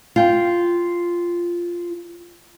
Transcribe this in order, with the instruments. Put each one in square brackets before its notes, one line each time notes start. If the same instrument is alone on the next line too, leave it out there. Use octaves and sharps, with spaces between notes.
[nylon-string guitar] F4 G5